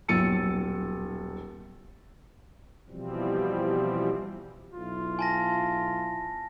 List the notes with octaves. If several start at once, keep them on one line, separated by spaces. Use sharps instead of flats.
D#1 B1 E6 A6 C#7 D#7
B2 E3 F3 G3 C4
B1 E4 F4
G#5 A5 A#6